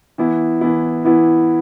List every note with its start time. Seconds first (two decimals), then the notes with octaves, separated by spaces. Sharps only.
0.18 E3 B3 E4
0.61 E3 B3 E4
1.05 E3 B3 E4